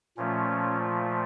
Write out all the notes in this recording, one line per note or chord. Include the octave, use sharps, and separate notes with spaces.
A#2 F3 A3 C#4